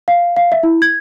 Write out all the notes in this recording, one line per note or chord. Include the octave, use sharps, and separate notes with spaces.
F5
F5
E5
E4
G#6